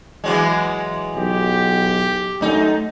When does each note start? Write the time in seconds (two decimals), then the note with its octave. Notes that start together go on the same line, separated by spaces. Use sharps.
0.24 E3 F#3 G#3
1.15 B1 G4
2.41 F#2 A3 D#4